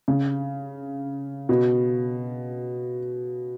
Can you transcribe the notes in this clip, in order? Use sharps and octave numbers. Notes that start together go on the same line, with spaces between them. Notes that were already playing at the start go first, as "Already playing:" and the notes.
C#3
B2